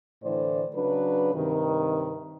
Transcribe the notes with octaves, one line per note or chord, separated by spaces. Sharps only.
A2 D3 E3 C5 D5
C#3 F#3 D4 B4
G2 C3 D#3